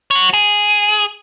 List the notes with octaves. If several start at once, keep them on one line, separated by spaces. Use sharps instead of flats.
F#4 C#5
G#4